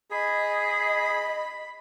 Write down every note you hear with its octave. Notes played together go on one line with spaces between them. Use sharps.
G#4 D#5 B5